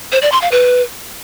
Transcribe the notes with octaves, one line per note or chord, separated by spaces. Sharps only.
C5
D5
C6
F5
B4